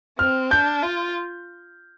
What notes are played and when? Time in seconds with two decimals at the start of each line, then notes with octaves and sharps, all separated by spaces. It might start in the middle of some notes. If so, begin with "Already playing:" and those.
0.19 C4 F6
0.51 D4 G6
0.82 F4